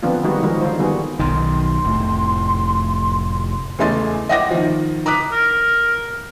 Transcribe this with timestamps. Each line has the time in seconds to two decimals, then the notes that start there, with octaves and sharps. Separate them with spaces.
0.03 D3 F3 B3 C4 D4 F4
0.24 D#3 G3 G#3 B3 D#4 F#4
0.43 D#3 F3 G#3 D#4 F#4 A#4
0.61 D3 F4 C5
0.79 D#3 G3 B3 F#4 G#4
1.19 B1 D#3 C6
1.84 F1 A2
3.79 E2 C#3 A3 D#5 C6 A6
4.29 D#5 E5 F#5 G5 D6 A#6
4.51 D#3 F3
5.06 A#5 D6 D#6 F#6 B6
5.32 A#4